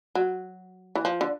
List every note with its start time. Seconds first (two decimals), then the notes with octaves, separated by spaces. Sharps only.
0.15 F#3
0.95 E3
1.05 F3
1.21 D3